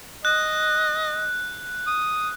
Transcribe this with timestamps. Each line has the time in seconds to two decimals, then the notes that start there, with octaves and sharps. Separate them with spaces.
0.25 D#5 F#6
1.87 D#6